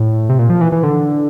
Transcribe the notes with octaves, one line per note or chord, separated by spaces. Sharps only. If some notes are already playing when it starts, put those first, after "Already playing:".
Already playing: A2
C3
A#2
F3
E3
E3
D3